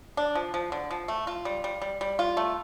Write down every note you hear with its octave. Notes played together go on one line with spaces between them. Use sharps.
D4
F3
F3
D3
F3
A3
F4
G3
G3
G3
G3
F4
A3